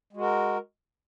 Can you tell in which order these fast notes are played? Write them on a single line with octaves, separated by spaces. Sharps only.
G#3 F#4 A#4